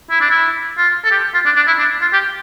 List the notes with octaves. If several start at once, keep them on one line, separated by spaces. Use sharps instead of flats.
E4
D4
E4
F4
A4
G4
F4
D4
D4
E4
D4
F4
G4